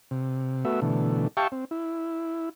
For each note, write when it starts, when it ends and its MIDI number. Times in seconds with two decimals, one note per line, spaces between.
0.11 0.65 48
0.65 0.80 57
0.65 0.80 59
0.65 0.80 66
0.65 0.80 76
0.82 1.28 47
0.82 1.28 50
0.82 1.28 52
0.82 1.28 57
1.37 1.47 67
1.37 1.47 76
1.37 1.47 77
1.37 1.47 79
1.37 1.47 81
1.37 1.47 85
1.52 1.65 60
1.71 2.49 64